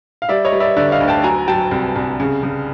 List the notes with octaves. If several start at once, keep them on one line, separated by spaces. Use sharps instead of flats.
F5
G3 D5 E5
C#5 D#5
G3
D5 E5
D3 D5 E5
D#5 F5
D2
G5 A5
F#3 G#5 A#5
F#3 G5 A5
C2
C2
C#3
C#3